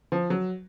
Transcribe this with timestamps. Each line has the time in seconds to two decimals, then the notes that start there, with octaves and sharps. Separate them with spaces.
0.12 F3
0.30 F#3